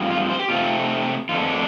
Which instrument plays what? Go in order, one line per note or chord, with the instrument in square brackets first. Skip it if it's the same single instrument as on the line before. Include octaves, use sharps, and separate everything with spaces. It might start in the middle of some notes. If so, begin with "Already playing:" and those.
Already playing: [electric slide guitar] G2 F3 C4
F4
C5
G4
C3 A3 C4 F4
F2 D3 A3 F4
D4